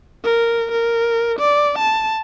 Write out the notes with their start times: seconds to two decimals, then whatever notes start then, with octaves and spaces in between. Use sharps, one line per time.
0.24 A#4
0.72 A#4
1.39 D5
1.79 A5